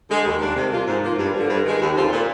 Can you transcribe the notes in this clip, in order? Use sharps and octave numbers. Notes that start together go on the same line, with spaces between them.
D3 G#3
D#2
D#3 G3 A#3 D4
C3
G3 A#3 F4
G#2
F3 A#3 F4
G2
D3 F3
G2
D#3 G#3
D#2
D3 F3 C4 F4
A#2